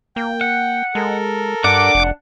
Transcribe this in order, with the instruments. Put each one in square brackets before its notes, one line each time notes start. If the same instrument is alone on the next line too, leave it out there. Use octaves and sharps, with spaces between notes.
[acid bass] A#3 [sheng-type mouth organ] G5
[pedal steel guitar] F#5
[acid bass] G#3 [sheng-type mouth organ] A4 A#4
[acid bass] G2 [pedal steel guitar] D4 F#5 [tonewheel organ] D6
[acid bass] F1